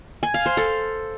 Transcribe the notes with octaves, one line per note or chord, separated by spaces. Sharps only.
G#5
F5
C5
A4